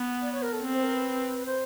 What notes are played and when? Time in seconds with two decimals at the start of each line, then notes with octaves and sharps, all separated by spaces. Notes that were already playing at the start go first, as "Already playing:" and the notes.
Already playing: B3
0.21 D5
0.31 C#5
0.42 A#4
0.52 A4
0.62 C4
0.72 C5
0.83 A#4
0.93 B4
1.45 C5